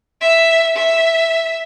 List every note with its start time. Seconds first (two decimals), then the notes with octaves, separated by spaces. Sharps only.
0.21 E5
0.76 E5